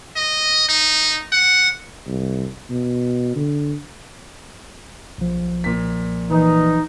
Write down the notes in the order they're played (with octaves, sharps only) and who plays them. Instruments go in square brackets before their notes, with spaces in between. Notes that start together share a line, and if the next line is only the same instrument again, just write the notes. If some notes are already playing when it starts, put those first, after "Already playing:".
[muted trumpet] D#5
D#4
F#5
[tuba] C2
B2
D3
[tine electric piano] B1 F3
[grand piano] A#2 B6
[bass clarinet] E3 [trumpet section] D#4